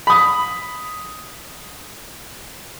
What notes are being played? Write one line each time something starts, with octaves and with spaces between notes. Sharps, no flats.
B5 D#6